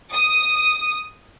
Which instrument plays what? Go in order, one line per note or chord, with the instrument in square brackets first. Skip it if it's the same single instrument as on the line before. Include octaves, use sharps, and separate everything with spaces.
[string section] D#6